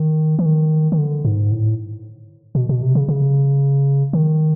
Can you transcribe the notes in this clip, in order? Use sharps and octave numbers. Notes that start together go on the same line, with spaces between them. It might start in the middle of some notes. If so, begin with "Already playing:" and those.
Already playing: D#3
E3
D#3
D#3
D3
G#2
A2
B2
B2
C3
C#3
C#3
D#3